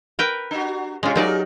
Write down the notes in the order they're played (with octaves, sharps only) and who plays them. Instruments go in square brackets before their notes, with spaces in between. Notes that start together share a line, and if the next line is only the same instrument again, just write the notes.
[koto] A#4 B4 G5
[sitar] D4 F#4
[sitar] C3 C#4 [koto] G#3 F4
[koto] F#3 D#4 D5 [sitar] G4 G#4 A#4